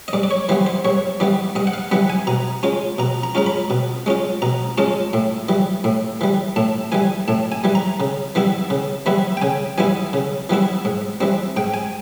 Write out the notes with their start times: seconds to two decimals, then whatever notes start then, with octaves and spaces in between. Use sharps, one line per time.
0.08 D#5
0.13 G2 D5
0.23 D5
0.31 C#5
0.49 E3 G3 B3 C5
0.66 C5
0.85 G2 C#5
1.20 E3 G3 B3 D5
1.55 G2 D#5
1.67 F#5
1.73 F5
1.92 E3 G3 B3 F#5
2.10 G#5
2.27 B2 A#5
2.63 G#3 C#4 F4
2.98 B2 A#5
3.23 A#5
3.35 G#3 C#4 F4 A#5
3.46 B5
3.70 B2
4.06 G#3 C#4 F4
4.42 B2 A#5
4.78 G#3 C#4 F4 A5
5.13 A2
5.49 E3 G3
5.84 A2
6.21 E3 G3
6.56 A2 A5
6.92 E3 G3 G#5
7.28 A2 A5
7.52 G#5
7.64 E3 G3
7.75 A#5
8.00 C#3
8.35 E3 G3 B3 E4
8.70 C#3
9.06 E3 G3 B3 E4
9.37 G5
9.42 C#3 G#5
9.78 E3 G3 B3 E4 G#5
10.13 C#3
10.49 E3 G3 B3 E4
10.85 G#2
11.21 E3 G3 C4
11.56 G#2 G5
11.74 G#5